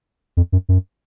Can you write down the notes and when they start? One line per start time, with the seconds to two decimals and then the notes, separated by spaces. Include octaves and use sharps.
0.37 F2
0.52 F#2
0.69 F#2